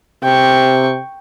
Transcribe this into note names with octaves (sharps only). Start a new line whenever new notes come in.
C3 G5 C#6